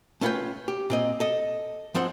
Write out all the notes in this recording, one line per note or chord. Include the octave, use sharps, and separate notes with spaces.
A3 C#4 F4 B4 C#5 G5
G4
A#2 C4 D#5
A4 D#5
G#2 F3 C4 C5 F#5